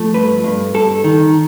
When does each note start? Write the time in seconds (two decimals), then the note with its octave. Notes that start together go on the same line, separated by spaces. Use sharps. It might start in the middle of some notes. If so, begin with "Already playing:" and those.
Already playing: F3 A3
0.14 G2 B4
0.44 G2
0.74 G2 A4
1.04 D#3